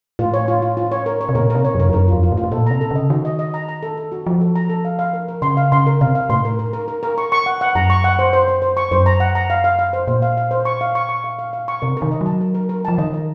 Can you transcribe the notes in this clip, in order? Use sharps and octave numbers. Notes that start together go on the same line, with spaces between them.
A2 F4
C#5
F4
F4
F4
C#5
A#4
C#5
C3
A#2 A#4
C3 A#4
C#5
F#2 A#4
F2
F#2 A#4
F2 F4
F4
A2
F4
A2
A#2 A4
C3 A#5
A4
C#3 D#5
D#3 F#4
D#5
D#5
A#5
A#5
A4
A4
F#4
F3 F#4
A4
A#5
A4
F5
F5
A#4
A#4
C#3 C6
F5
C#3 C6
A#4
C3 F5
F5
A2 C6
A#4
A#4
A#4
A#4
A#4
C#6
C#6
F#5
F#5
F#2 A#5
C#6
F#5
C5
C5
C5
C5
C#6
F#2 C5
A#5
F#5
A#5
F5
F5
F5
C5
A#2 C5
F5
F5
C5
C#6
F5
C#6
C#6
F5
F5
F5
C#6
C3 A#4
A#4
D#3
D#5
F#3 A5
A#4
A#4
A#4
F3 A5
D#3 D#5
A#4